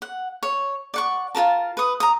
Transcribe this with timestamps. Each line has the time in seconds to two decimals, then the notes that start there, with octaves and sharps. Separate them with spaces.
0.02 F#5
0.43 C#5
0.94 D5 F#5 C#6
1.35 F4 F#4 A#4 A5
1.77 B4 D#6
2.00 A#5 D#6